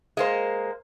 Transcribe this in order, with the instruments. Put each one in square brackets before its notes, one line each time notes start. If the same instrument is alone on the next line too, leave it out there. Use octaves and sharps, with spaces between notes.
[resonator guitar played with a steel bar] G#3 A#3 C5